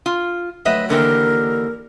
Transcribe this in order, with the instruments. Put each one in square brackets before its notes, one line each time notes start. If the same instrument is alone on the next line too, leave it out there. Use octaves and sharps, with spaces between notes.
[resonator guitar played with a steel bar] F4
[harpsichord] D2 F#3 G5 [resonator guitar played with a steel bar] B4 D#5 E5
[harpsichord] D#2 [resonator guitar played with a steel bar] D3 E3 G4 [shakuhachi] A#4